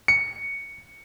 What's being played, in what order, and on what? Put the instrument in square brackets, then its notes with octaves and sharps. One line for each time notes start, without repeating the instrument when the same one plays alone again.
[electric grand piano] C#7